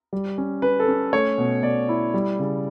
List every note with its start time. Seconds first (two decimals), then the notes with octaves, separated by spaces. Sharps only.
0.13 G3
0.38 C#4
0.62 C#4 B4
0.80 A4
0.88 C#4
1.13 A3 C#5
1.38 B2
1.63 B2 D5
1.89 E4
2.14 G3
2.39 C#3